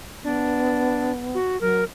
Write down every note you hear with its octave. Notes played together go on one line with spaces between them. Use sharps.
B3 D4
F#4
F#3 A#4